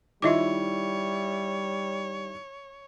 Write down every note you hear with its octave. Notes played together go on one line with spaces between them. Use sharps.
D#3 G3 E4 F4 C#5 D#5 E5 D6